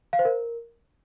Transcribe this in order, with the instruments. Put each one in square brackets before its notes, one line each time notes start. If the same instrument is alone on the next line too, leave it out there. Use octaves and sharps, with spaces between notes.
[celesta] F5
C5
A#4